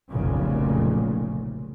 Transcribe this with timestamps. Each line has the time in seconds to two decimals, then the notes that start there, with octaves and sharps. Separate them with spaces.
0.10 F1 B1 A#2 C#3